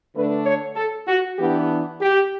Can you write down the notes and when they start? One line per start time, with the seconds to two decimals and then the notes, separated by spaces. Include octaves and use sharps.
0.15 D3 A3 D4 B4
0.46 C#5
0.76 A4
1.08 F#4
1.38 E3 B3 D4 G4
2.00 G4